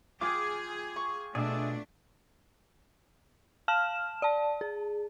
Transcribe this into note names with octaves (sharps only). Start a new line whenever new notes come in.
F4 G#4 G5 D6
C#6
B2 A3 D4 G#4 D5 E5
F5 A5 F6 E7
D5 A5
G#4